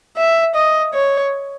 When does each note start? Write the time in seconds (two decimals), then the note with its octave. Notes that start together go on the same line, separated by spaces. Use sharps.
0.17 E5
0.55 D#5
0.94 C#5